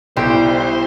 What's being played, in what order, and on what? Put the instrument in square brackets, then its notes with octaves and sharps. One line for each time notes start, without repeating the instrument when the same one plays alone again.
[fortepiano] B1 G5 [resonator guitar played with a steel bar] G3 [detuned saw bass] E4 [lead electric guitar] C5